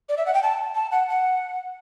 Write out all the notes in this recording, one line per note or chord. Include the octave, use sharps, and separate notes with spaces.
D5
E5
F#5
G5
A5
A5
F#5
F#5